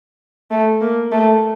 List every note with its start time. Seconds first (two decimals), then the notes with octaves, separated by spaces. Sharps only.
0.51 A3
0.81 A#3
1.12 A3